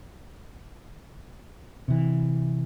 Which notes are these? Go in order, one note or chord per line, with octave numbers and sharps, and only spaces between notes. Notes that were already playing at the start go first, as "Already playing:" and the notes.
C3 E3